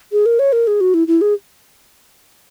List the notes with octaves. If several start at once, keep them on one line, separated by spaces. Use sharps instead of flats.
G#4
A#4
C#5
A#4
G#4
F#4
E4
E4
G#4